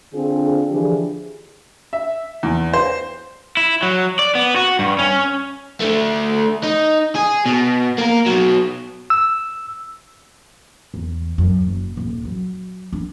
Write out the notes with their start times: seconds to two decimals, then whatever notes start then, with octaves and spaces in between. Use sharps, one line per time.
0.14 D3 C4 D4 F4 G#4
0.70 D3 E3 F3 D4 G4 G#4
1.93 E5
2.43 E2
2.73 C5
3.57 E4
3.83 F#3
4.19 D5
4.35 B3
4.56 F#4
4.79 G2
4.99 C#4
5.81 D3 A3
6.63 D#4
7.15 G#4
7.46 B2
7.98 A#3 A#4
8.26 B2 F#3
9.10 E6
10.94 E2
11.38 F#2
11.67 F#1
11.97 D#1
12.25 F#3
12.93 D4